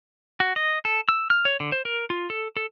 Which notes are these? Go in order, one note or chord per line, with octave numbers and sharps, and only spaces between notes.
F#4
D#5
A4
E6
F6
C#5
D3
C5
A#4
F4
A4
A4